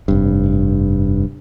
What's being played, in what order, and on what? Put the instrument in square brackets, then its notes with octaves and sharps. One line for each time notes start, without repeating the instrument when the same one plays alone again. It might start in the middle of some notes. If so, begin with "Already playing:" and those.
[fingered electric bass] F1 G2